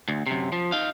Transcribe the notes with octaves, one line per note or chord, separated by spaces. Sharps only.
D2
F#2 C3
F3
D#4 F5